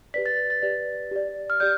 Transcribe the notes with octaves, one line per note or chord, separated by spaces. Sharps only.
G4 B4 D5 B6
A6
A6
G4 B4 D5
G4 D5
F6
G4 D5 G6